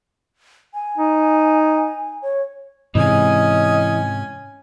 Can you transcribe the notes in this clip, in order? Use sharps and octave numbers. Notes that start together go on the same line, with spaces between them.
G#5
D#4
C#5
G#2 C3 E3 C#4 D#5 G#5